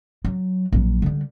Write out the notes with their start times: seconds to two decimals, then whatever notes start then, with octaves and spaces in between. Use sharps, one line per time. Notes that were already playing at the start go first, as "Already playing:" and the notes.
0.25 F#3
0.72 A#1 F#3
1.02 D3 G3